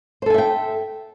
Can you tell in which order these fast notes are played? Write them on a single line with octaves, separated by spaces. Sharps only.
C5 A4 G#5 E5 G5